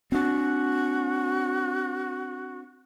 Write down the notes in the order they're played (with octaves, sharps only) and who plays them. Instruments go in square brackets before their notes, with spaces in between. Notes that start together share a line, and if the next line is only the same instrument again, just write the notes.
[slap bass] C4 D4 [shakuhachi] F#4